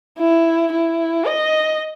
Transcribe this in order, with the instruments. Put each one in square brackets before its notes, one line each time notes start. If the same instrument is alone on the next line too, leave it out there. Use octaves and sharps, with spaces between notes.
[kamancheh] E4
E4
D#5